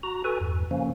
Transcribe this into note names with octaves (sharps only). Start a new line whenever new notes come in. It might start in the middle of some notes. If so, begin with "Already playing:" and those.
F#4 A#5
F#4 A4 B4 G#5
E2 G2
C#3 F3 A#3 C#4